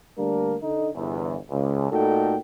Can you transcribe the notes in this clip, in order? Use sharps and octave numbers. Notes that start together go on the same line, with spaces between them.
D3 G3 A3 A#3 D4 A#4
D3 D#4
G1 E2
C#2
A#2 A3 D#4 F#4 A4 G5